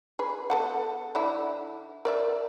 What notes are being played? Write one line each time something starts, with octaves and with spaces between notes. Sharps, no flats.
G#4 B4
B3 A4 F#5
D3 D4 E4
A#4 D5 E5